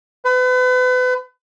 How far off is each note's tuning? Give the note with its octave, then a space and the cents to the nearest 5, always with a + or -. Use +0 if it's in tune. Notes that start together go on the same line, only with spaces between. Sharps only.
B4 +35